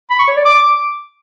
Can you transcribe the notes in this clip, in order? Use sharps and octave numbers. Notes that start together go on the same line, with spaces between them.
B5
C#6
C#5
D5
D6